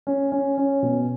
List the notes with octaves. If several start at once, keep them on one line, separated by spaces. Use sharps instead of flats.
C#4
C#4
C#4
B2